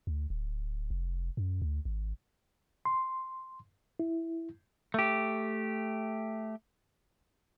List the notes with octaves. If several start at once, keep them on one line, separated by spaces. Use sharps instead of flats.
D2
D1
F1
F#2
D2
G#1
C6
E4
A3 G4